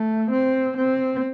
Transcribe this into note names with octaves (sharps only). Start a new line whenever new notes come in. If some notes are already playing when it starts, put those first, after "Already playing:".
Already playing: A3
C4
C4